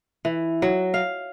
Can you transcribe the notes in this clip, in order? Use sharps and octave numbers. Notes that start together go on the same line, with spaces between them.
E3
F#3
F5